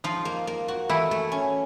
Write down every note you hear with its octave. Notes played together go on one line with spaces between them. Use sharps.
F3 D#4 F4
A#3
A#3
F#4
E3 A3 E4
A3
C#4